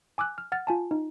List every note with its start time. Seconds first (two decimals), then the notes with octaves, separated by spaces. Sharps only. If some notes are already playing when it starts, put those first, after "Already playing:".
0.18 G#5 D6 E6 F#6
0.38 F6
0.52 F#5 F6 A6
0.67 F4 G#5 A5
0.91 D#4